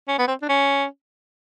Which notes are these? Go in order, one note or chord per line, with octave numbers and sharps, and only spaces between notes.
C#4
B3
C4
D4
C#4